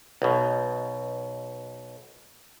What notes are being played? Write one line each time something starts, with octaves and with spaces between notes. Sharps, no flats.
B1 B2